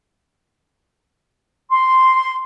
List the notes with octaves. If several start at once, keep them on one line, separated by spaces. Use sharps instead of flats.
C6